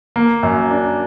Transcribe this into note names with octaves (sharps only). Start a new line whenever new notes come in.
A#3
F#2
D4